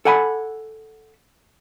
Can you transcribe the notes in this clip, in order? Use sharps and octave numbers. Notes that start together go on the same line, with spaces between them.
A4 D5 F#5 G#5 A5 B5